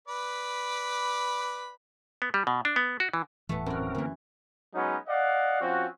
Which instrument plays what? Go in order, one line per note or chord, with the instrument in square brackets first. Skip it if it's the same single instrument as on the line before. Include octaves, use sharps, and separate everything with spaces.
[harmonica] B4 D5 B5
[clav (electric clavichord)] B3
G3
B2
D4
B3
F#4
E3
[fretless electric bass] D#1 A2 E3 [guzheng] A3 B3
[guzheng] F#2 F#4 [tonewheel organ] C4 A#4
[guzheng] F#2 E3 [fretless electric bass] D3 A#3
[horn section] F#3 G#3 B3 C#4 D#4
D5 D#5 F5 F#5
F3 C4 C#4 F#4